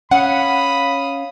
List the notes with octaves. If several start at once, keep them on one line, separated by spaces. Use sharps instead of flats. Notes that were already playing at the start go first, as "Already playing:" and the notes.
C#4 F5 F#5 B5 D#6